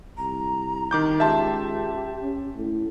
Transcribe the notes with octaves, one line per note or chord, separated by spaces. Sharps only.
C2 A#5
D#3 D6 G6
C#2 G4 E5 A5 C6
C#4
A2